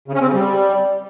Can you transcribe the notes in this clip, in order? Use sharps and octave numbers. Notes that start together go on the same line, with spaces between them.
C#3
C#4
C4
C#3
G3